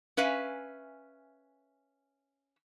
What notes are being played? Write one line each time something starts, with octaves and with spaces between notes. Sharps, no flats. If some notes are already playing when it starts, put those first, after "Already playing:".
C#4 B4 E5 F5 G#5